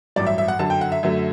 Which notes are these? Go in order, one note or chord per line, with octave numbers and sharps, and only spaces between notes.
A1 G2 F#3 D5
E5
E5
F#5
F#2 D3 F#3 A5
G5
F#5
E5
F#2 D3 F#3 A3